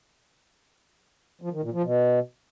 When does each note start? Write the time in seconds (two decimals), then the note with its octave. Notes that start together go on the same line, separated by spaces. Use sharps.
1.42 F3
1.52 D#3
1.62 A#2
1.73 F3
1.83 B2